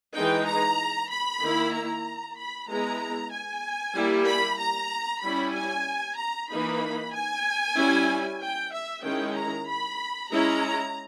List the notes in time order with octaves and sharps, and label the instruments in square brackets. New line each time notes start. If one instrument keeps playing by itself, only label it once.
[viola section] E3 G#3 D#4 G5
A#5
B5
D#3 A#3 E4
A#5
B5
G#3 B3 E4 A#5
G#5
G3 A#3 E4
B5
A#5
G3 C#4 E4 B5
G#5
A#5
E3 A#3 D#4 B5
G#5
G3 C#4 E4
G5
E5
D#3 G#3 C#4 E4 G5
A#5
B5
G#3 C#4 E4 A#5